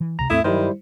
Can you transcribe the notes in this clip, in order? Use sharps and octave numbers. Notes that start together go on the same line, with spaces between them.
E3
C#2 C3 A#5
D#2 G#2 A3 C4 E4 E5 D#6
G2 D#3 F#3 G3 E4 C5